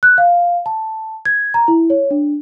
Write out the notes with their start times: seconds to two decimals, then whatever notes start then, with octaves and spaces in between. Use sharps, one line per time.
0.03 F#6
0.18 F5
0.66 A5
1.25 G#6
1.54 A#5
1.68 E4
1.90 C#5
2.11 D4